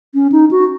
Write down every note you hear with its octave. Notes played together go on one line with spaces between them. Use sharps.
C#4
D#4
F#4